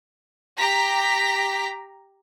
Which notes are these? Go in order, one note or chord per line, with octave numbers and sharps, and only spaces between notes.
G4 A#5 B6